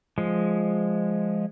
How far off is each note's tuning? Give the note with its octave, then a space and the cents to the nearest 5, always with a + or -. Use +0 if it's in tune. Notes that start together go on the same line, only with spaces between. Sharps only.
F3 +0 G#3 +0